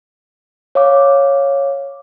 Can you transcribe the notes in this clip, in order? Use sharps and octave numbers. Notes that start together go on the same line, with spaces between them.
C#5 F5 D6